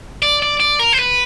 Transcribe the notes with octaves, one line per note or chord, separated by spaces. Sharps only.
D5
D5
D5
A#4
C5
B4